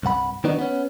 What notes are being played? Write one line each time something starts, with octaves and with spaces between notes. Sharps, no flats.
C2 G2 F#5 B5
D#3 E3 B3 D4 D#4 F#4
B3 C#4